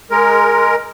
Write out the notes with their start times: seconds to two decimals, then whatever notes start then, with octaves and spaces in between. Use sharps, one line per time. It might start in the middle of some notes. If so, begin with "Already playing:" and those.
0.11 G#3 A#4